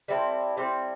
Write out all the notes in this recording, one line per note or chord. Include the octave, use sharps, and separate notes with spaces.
G3 C4 E4 A4
G3 C4 E4 A4